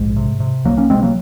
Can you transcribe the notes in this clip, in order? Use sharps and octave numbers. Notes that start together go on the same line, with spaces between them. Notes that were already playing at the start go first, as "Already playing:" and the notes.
Already playing: A#1 G#2 G#3
C3
C3
C2 F#3 A#3
A#3 C#4
C3 G#3 C4
F#3 A#3